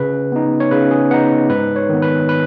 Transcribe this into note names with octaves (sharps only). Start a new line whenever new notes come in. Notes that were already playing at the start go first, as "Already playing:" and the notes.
Already playing: C#3 B4
B3 D#4
C#5
C#3 B4
G#4
B3 D#4 F#5
G#2 B4
C#5
D#3 B3
B4
B4